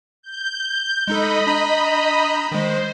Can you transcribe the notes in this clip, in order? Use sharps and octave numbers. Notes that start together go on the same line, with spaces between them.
G6
G#3 D#4 A4 D#5 B5
D4 A#5 G6
D#3 G#3 C5